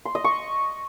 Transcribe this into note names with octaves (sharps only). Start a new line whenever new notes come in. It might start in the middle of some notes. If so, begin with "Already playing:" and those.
C6
D#5
C#6